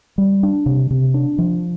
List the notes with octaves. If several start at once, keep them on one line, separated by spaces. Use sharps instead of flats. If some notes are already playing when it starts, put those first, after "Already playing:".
G3
D4
C3
C3
D4
F3